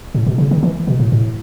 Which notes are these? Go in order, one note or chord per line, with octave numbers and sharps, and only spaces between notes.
A2
B2
C#3
D#3
E3
B2
A2
A2